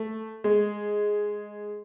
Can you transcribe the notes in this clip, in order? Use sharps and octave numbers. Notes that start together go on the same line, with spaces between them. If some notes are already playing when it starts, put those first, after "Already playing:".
Already playing: A3
G#3